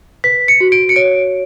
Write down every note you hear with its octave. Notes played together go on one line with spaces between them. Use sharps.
B4 B6
C#7
F#4
D7
C#7
C#5 D7